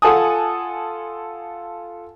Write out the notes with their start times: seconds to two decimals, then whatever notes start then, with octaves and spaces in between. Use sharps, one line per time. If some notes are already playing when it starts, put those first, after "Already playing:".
0.02 F4 A4 F#5 G#5 A5 D#6